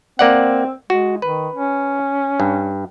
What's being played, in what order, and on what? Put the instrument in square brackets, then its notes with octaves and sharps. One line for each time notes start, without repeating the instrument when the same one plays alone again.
[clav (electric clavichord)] A#3 D5 F#5 [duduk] C4
[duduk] G#3 [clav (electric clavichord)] F#4
[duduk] D#3 [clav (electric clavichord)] B4
[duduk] C#4
[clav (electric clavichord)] G2